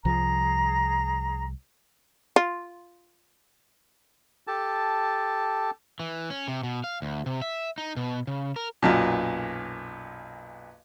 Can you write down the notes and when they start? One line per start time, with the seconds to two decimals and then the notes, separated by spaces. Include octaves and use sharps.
0.05 C2 F3 G#4 A#5
2.36 F4
4.47 G4 A4 A5
6.00 E3
6.30 C#4
6.48 C3
6.63 B2
6.84 F5
7.02 D2
7.26 C3
7.42 E5
7.78 D#4
7.96 B2
8.27 C#3
8.56 A#4
8.82 B1 F#2 A#2